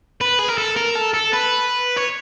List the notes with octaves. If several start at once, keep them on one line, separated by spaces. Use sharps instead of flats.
B4
G#4
A#4
A4
A#4
A4
A4
B4
C#5